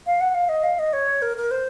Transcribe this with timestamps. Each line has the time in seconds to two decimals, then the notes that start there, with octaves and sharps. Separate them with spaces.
0.07 F5
0.21 F#5
0.35 F5
0.49 D#5
0.63 F5
0.79 D#5
0.93 C#5
1.22 A#4
1.37 A#4
1.51 C5